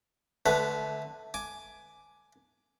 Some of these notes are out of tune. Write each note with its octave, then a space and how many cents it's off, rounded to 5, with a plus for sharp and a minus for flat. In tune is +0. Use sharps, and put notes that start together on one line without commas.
D3 +0 A3 -20 B4 +5
G#5 +15 D6 +0